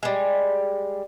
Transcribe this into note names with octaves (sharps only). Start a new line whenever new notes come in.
G3 G#3